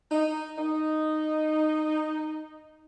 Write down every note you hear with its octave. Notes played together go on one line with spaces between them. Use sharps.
D#4
D#4